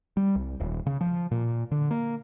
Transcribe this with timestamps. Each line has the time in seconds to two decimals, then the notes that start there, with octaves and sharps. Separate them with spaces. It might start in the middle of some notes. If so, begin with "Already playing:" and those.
0.17 G3
0.36 C2
0.60 D#1
0.87 C#3
1.01 F3
1.31 A#2
1.72 D3
1.91 A#3